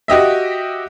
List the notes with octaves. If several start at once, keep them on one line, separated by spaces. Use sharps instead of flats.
F#4 G4 D#5 E5